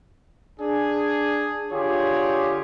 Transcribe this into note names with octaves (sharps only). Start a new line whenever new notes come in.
D4 G#4
D3 F4 G4 G#4 C#5